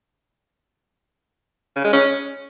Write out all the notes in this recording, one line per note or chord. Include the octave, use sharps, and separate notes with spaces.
C#3
G#3
C#4